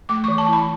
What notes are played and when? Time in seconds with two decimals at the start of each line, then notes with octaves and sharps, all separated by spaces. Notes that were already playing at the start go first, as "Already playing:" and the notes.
0.09 A3 D6
0.24 E3 C#6
0.38 A5
0.48 E4 B5